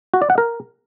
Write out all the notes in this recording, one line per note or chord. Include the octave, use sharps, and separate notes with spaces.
F#4
D5
F#5
A#4